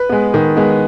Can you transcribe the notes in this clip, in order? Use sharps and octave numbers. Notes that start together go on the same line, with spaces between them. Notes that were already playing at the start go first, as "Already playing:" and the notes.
Already playing: B4
G#3 B3
D#3
G#3 B3